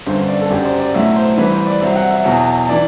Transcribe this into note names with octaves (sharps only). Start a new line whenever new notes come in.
G1 F#2 D3 C5
D5
A4
F#1 F#2 F#3 G4
D5
C5
D5
B1 A2 F#3 E5
C5
C2 C3 E3 B4
C5
D5
C2 C3 F#3 E5
F#5
E5
E2 B2 F#3
E3 D5